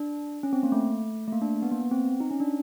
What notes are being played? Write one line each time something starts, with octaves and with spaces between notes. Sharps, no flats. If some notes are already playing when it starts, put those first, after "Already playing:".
Already playing: D4
C#4
C4
A#3
A3
A3
A#3
D4
B3
A#3
B3
C4
D#4
C#4
D4